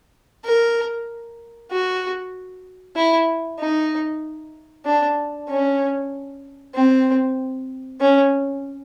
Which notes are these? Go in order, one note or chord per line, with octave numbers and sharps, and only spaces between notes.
A#4
F#4
E4
D#4
D4
C#4
C4
C#4